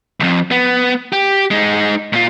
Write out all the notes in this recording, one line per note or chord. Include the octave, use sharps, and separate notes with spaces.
C2 F2
B3
G4
G#3 D#4
A#2 F4